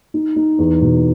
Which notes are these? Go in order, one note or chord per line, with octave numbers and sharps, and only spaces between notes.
D#4
D#4
E2
B2